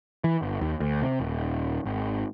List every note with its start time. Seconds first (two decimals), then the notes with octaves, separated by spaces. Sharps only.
0.24 E3
0.42 G1
0.61 D#2
0.80 D2
1.02 C3
1.20 D#1
1.85 G#1